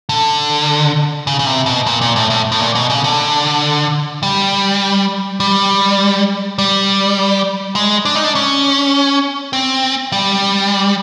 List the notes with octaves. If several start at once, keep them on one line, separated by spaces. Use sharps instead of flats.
D3
C#3
C#3
C3
B2
A#2
A#2
A2
A2
A2
A#2
B2
C#3
D3
G3
G3
G3
G#3
D4
D#4
D4
C#4
C4
G3